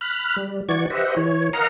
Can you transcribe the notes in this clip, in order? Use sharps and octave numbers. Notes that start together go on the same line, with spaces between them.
B5 F6 F#6
G3
E3 F#4 D5 C#6 G#6
G4 B4 C5 D#5 E5 F#5
E3 C#5
A#4 D#5 F5 F#5 A#5